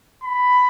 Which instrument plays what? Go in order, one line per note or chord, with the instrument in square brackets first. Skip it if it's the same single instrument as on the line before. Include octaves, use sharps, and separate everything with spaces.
[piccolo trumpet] B5